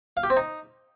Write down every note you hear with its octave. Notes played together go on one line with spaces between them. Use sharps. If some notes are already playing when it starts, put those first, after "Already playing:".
F5
G4
C4
D#4